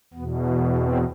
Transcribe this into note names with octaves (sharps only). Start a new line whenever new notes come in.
E2 B2 B3
B3
C4